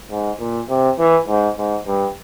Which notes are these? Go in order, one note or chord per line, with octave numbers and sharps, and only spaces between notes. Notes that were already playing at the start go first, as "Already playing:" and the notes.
G#2
A#2
C3
E3
G#2
G#2
G2